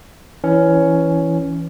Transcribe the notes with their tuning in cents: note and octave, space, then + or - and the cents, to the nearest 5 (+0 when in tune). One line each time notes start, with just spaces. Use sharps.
E3 +0 C#4 +10